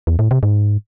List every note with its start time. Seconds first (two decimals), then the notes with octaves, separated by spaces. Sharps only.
0.07 E2
0.19 A2
0.31 C3
0.43 G#2